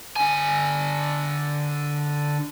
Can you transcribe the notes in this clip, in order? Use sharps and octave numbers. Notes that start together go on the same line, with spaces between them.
D3 G#5